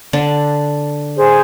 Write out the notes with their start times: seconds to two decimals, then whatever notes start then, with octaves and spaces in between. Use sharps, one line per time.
0.13 D3 D4
1.16 G#4 C5